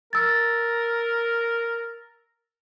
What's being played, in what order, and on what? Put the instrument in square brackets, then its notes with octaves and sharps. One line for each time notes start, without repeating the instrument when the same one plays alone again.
[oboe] A#4 [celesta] E6 A6